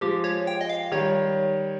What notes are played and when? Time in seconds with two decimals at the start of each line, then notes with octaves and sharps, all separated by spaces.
0.01 F3 G#3 G4
0.24 C#5
0.47 G5
0.61 D#5
0.69 F5
0.92 D#3 G3 C#5